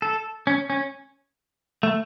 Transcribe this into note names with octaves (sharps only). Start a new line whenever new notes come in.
A4
C#4
C#4
A3